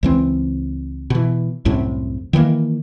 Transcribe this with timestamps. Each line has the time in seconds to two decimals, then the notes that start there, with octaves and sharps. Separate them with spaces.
0.03 C#2 E3 C4
1.10 B2 E3
1.65 C2 F#2 A2 C3
2.33 D#3 E3 G#3 A#3